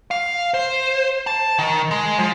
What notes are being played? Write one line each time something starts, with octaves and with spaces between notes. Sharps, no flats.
F5
C5
A5
D#3
G#3
F3